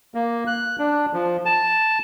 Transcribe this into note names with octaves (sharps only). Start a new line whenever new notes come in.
A#3
F#6
D4
F3
A5